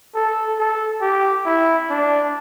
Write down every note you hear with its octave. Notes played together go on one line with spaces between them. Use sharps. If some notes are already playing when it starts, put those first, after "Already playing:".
A4
A4
G4
E4
D4